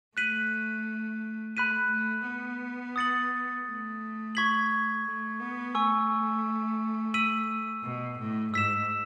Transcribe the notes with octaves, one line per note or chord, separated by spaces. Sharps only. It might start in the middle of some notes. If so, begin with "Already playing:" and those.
A3 F#6 B6 D#7 F#7
A3 B5 F#6 B6 D#7
A3
B3
D#6 A6 C#7 F#7
A3
C#6 G#6 B6 F#7
A3
B3
A3 G#5 C#6 E6
E6 B6 D#7 F#7
B2
A2
G#2 E6 B6 E7